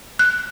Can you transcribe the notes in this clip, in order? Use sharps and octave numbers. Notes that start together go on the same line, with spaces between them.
F#6